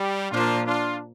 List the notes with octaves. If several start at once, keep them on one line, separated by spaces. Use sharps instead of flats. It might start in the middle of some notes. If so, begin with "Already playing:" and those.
Already playing: G3
A#2 F3 A#3 D4 F4
D4 F4